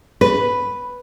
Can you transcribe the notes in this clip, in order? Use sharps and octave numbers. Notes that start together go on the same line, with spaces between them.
B4